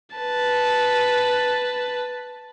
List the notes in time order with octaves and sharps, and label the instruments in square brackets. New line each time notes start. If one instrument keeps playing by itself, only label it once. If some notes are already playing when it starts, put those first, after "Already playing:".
[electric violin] B4 A5